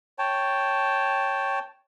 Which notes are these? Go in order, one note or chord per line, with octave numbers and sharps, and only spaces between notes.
C#5 G5 A5